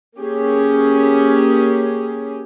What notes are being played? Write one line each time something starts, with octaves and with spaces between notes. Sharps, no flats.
A#3 C#4 G4 G#4